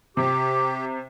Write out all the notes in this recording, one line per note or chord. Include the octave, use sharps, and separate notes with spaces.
C3 G4 D6